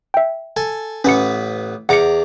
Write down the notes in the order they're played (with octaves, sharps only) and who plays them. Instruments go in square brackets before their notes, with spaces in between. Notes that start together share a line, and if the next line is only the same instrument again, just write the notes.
[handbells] E5 G5
[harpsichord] A4 G#5
[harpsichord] A1 B3 B4 [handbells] C#4 C#7
[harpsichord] E2 A#5 D6 [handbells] F#5 C#7